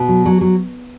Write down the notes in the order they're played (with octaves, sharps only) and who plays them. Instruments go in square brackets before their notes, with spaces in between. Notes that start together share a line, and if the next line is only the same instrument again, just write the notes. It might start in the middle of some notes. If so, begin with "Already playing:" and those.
Already playing: [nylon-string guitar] B2
F#3
F#3
F#3